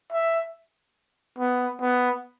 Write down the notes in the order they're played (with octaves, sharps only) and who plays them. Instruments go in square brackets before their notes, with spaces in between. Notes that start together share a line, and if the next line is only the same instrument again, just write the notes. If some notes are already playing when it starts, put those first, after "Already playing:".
[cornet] E5
B3
B3